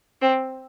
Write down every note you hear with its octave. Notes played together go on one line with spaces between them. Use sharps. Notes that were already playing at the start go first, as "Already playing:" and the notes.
C4